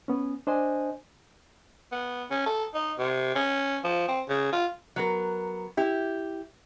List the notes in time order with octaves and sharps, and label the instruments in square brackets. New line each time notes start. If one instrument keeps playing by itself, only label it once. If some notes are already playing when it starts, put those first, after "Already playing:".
[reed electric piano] B3 C#4
D4 C5 D#5 G#5
[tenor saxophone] B3
C#4
A4
D#4
C3
C#4
F3
C4
C#3
F4
[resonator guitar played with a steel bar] F#3 B3 A#4
E4 G4